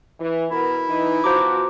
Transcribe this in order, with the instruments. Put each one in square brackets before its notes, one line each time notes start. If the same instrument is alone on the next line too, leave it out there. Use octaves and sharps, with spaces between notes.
[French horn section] E3
[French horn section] B2 B3 A#4 [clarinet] E4
[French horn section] E3 D#4
[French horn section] B2 F3 F#4 [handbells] C5 A#5 D6